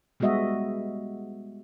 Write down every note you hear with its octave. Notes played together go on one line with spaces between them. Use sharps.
G3 G#3 B3 F#4 D#5 E5